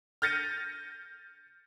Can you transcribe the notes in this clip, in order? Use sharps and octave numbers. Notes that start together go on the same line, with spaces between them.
F6 G6 A6 A#6 C#7 D#7